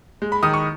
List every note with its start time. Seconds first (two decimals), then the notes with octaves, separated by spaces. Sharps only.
0.22 G#3
0.32 B5
0.43 D#3 D#6
0.54 C#6